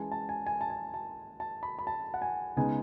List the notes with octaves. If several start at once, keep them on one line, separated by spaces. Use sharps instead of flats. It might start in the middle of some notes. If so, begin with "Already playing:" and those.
Already playing: E3 G#3 C#4 G#5 A5
A5
G#5
G#5
A5
G#5
A5
A5
B5
B5
A5
F#5
G#5
C#3 G#3 B3 D#4 G#5